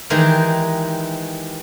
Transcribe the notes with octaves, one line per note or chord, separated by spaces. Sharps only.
D#3 E3 G#3 G4 A#4